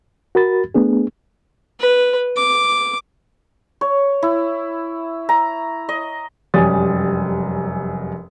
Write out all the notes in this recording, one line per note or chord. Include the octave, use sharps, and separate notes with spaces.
F#4 A#4 B5 A6
A3 B3 D4 G#4
B4
D6
C#5
E4
A#5
D#5
F1 F#2 G3 G#5 D#6 A6